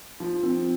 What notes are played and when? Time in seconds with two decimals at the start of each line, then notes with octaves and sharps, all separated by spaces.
0.20 F3
0.43 C4